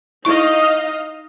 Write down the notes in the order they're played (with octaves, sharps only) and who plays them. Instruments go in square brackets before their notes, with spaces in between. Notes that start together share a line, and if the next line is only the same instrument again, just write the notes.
[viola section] D#4 D#5 F5 [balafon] E4 C#6